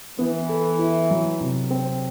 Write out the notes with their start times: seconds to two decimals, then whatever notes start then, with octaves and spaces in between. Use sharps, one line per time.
0.19 E3 B3
0.49 A4
0.79 E4
1.11 F#3
1.40 C3
1.71 C4